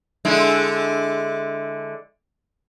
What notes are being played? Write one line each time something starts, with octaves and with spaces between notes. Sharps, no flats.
D3 G#3 E4